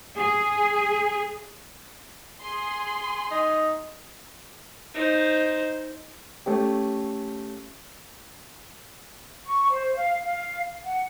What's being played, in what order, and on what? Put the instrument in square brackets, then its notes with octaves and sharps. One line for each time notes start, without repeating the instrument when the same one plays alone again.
[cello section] G#4
[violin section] G#4 C6
[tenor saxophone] D#4
[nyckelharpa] D#4 C5
[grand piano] A3 C#4 G4
[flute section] C#6
C5
F5
F5
F#5